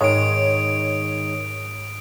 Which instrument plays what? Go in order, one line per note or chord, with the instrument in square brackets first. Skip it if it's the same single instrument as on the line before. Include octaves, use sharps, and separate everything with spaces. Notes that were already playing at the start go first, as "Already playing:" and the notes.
[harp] G#2 [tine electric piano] D#3 G#3 [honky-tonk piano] C#5 [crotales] D#6 D7